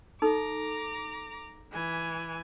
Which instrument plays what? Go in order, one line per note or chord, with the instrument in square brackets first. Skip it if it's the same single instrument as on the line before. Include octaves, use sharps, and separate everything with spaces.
[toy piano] D#4 A4 [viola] A#5 D6
[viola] E3 G#5